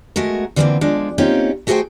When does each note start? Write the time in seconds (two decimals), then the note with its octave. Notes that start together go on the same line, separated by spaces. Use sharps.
0.16 G#3 A3 F#4 A#4
0.56 D3 E3 F3 A3 A#3 C4
0.81 F3 G#3 D4
1.18 A#3 C4 C#4 D#4 F4 G4
1.67 A3 F#4 G#4 A#4 C5 G5